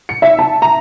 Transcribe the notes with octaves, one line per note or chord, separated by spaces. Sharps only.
C#7
E5
A5
A#5